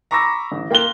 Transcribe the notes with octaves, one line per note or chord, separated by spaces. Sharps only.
A#5 B5 C#6 D6 E6 A#6
A1
A#3 G5 C6 F#6 G7